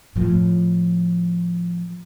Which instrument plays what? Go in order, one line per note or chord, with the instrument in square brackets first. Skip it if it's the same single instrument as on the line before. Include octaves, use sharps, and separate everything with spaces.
[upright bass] A2 F3